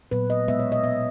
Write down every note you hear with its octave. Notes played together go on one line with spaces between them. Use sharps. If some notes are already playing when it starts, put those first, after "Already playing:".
A#2 F#3 B3 B4
D#5
B2 G#3 B3 E5
C#5
D#5
B2 G#3 B3 E5